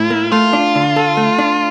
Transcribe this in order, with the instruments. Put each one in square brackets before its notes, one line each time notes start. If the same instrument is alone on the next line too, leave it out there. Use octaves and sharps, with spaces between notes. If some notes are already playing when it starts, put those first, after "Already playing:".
Already playing: [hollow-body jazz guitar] A2 [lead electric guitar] E4
[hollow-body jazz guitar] A#3
[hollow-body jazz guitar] A3 [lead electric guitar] F4
[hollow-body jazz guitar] D4
D3
A4
A3
D4